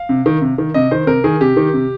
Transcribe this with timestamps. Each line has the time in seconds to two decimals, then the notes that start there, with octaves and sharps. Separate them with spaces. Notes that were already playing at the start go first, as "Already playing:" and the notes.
Already playing: F5
0.09 C3
0.26 D#3
0.41 C3
0.58 D#3
0.74 C3 D#5
0.91 D#3 C5
1.07 C3 A#4
1.24 D#3 G#4
1.41 C3 G4
1.57 D#3
1.74 C3